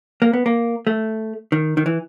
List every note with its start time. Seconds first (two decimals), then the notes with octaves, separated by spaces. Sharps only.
0.22 A#3
0.33 B3
0.46 A#3
0.87 A3
1.52 D#3
1.77 D#3
1.86 E3